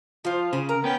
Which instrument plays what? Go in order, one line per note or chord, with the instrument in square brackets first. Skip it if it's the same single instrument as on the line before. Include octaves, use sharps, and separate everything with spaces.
[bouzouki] F3 C5 [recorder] F4
[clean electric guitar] C#3 [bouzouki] G#5
[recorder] A#4 [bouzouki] A#5
[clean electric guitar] B3 C#4 [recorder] G5